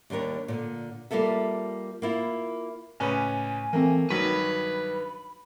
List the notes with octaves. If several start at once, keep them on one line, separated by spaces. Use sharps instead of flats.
D#2 G3 D4 A#4 C#5
A#2 D3
G3 A#3 F4 A4 E5
A#3 E4 F4
C#2 A2 C#4 B4 G#5 B5
E3 A3 A#3 C4
G2 D#3 F#3 F#4 B4 B5